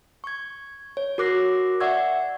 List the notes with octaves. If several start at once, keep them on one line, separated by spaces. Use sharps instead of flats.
C#6 G#6
C#5
F#4 A#4 D6 F#6 A#6 C7
D5 E5 F#5 C#6 E6 G#6